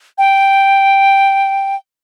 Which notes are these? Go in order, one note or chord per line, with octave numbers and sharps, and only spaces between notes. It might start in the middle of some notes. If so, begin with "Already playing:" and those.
G5